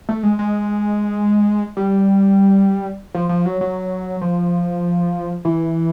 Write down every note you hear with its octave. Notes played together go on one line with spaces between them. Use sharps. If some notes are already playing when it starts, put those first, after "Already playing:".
A3
G#3
G#3
G3
F3
F3
F#3
F#3
F3
E3